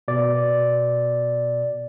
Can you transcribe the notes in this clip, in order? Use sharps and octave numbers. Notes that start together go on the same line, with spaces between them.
B2 D5